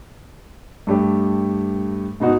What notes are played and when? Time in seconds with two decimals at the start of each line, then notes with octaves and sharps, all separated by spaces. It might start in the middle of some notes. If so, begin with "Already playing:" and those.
0.87 G2 A3 G4
2.20 G#2 B2 D#4 F#4